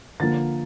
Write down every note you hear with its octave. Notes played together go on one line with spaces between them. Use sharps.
D3 F3 A#3 A6